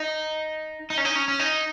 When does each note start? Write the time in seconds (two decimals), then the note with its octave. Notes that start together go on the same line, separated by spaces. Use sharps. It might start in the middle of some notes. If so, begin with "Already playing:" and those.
Already playing: D#4
0.90 D#4
0.98 C#4
1.05 D#4
1.15 C#4
1.28 C#4
1.39 D#4